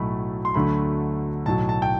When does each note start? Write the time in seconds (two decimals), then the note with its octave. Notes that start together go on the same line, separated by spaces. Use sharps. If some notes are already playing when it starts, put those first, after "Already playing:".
Already playing: B1 A2 F#3 A3 B5
0.45 C6
0.54 D2 D3 F#3 A3 B5
1.46 B1 A2 F#3 A5
1.69 A5
1.82 G5